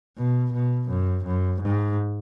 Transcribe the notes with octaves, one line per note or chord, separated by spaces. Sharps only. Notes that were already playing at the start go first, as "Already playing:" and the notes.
B2
B2
F#2
F#2
G#2